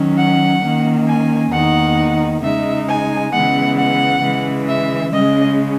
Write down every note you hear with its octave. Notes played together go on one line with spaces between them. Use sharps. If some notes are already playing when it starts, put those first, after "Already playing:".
Already playing: D#3 F#3 C#4
F#5
D#3 A#3 C#4
G#5
E2 D#3 A#3 D#4 F#5
C#3 G#3 D#4 E5
G#5
C#3 E3 G#3 B3 F#5
F#5
C#3 E3 G#3
E5
C#3 G#3 C#4 D#5